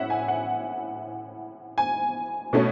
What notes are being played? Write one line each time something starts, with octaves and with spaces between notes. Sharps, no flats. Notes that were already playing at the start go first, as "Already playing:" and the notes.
Already playing: A2 C#4 E5 F#5
G#5
F#5
G#5
B2 A3 C#4